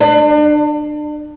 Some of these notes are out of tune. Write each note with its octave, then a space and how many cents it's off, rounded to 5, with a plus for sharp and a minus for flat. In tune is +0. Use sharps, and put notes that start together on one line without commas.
D4 +35